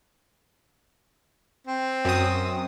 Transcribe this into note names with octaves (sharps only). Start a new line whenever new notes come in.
C4
F#2 D#6